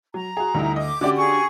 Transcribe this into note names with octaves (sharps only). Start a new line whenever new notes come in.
F#3 A#5
F#4 G#4
D2 G3 D#4 E4
D#5 D6
D3 C#4 F#4 G4 D5
G#4 C#6